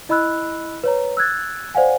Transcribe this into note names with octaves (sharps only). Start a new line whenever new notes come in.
E4 D#5 B5 E6 F#6
B4 C#5 A#5
E6 F#6 G#6 A6
C5 D5 F5 F#5 G#5